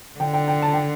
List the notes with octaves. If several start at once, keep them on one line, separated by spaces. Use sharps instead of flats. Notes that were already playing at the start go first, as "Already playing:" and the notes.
D3 G5
G5
G5
A5
G5